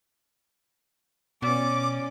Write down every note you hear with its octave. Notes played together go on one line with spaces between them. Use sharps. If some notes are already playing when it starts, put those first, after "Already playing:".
B2 C#4 D5 D6